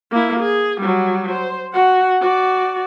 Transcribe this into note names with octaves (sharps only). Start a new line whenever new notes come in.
A#3 E4
G#4
F#3 G3
C5
F#4 F#5
F#4 D5